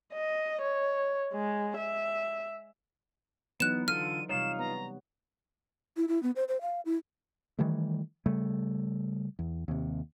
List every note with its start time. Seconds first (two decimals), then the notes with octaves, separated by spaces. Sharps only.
0.13 D#5
0.62 C#5
1.33 G#3
1.77 E5
3.60 E3 F#3 B3 D#4 F#6 E7
3.88 D3 F4 A4 F6 D#7
4.29 C3 G3 D#4 F4 C#5 F5 E7
4.59 B3 A#5
5.97 E4
6.08 E4
6.23 B3
6.36 C5
6.48 C5
6.61 F5
6.85 E4
7.59 D#3 E3 G3 A3
8.26 C#3 G3 A3
9.39 E2
9.68 D#2 C3